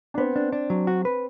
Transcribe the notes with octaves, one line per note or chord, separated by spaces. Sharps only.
D4
B3 C4
D4
D4
F#3
F#4
B4